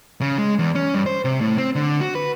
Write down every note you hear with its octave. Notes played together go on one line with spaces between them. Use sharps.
C#3
G#3
E2
C#4
G2
C5
C3
A2
C4
D3
F#4
B4